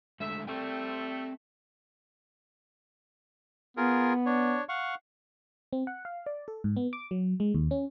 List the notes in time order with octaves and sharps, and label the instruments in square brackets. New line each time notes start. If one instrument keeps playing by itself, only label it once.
[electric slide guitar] D3 G#3 A3 [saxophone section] E5
[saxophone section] G3 A3 [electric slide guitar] C4 D5 G5
[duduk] B3 [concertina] F4 G#4 A#4
[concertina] D4 C#5
F5 F#5 C#6
[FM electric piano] C4
F#5
F5
D5
A4
G#2
B3
D6
F#3
G#3
D#2
C#4